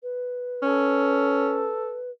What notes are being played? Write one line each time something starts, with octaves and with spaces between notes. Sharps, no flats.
B4
C#4 A4